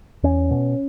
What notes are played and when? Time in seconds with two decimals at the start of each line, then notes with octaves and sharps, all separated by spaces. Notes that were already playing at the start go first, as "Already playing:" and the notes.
0.23 E2 C#4
0.51 B2